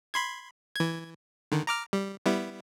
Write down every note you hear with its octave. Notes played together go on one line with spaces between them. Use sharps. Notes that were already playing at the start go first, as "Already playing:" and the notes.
B5 C6 G#6
E3 G#6
D3 D#3
A#5 D6 F6
G3
G3 B3 E4